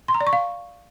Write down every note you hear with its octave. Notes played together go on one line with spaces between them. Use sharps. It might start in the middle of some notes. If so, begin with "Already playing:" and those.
C6
A#5
D5
C#6
F5